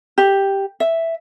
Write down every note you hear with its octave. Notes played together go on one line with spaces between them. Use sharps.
G4
E5